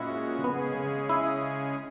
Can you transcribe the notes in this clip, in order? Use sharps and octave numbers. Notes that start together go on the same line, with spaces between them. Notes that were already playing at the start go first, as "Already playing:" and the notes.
Already playing: A#2 G#3 C#4 E4 F#4
C#3 G#3 B3 C#4 G#4
E4